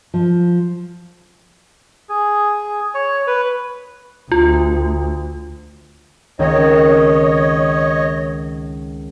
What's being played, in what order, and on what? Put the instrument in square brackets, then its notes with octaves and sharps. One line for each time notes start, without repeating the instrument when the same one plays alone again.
[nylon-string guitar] F3
[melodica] G#4
C#5
B4
[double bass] D2 [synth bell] F4
[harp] C#2 D#3 C4 [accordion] C#5 D#5